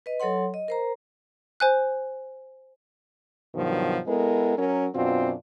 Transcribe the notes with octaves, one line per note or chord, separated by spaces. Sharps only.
B4 D#5
F#3 A4 C#5 F#5 C6
D#5
A#4 C5 A#5
C5 G#5 F#6
G2 B2 D#3 F3 F#3
G#3 B3 E4 A4 A#4
F#3 C#4 A#4
F#2 B2 C4 D4 F4